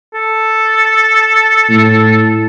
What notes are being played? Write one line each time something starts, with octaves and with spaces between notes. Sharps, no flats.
A4
A2